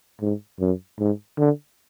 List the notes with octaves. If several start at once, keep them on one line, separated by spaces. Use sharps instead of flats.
G#2
F#2
G#2
D3